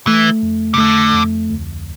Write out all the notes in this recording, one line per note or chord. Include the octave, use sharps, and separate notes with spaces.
E3 A3
F2
C3
D3 A3
F2
D2